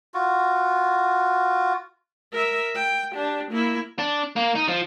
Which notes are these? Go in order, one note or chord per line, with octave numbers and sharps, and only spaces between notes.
F4 F#4
A#4 E5
G5
D4 G4
A#3 E4
D4
A#3
D#4
F3